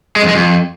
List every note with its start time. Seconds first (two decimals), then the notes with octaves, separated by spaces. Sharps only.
0.16 G#3
0.22 F2
0.29 G#3
0.35 F2